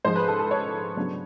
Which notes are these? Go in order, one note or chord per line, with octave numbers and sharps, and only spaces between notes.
G#2 F3 G#3 C5
B4
A4
A4
C#5
C#3 F#3 B3 D4